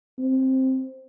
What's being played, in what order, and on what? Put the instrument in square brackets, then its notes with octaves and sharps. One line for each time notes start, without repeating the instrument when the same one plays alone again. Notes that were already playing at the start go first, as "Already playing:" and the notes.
[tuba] C4